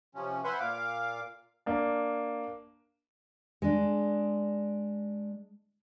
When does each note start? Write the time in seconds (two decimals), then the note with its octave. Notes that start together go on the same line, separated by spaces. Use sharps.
0.15 C3 F3 C#4
0.44 B4 C5 E5 F#5 G#5 C6
0.60 A#2 F5 D6
1.66 A#3 D4
3.62 G#3 D4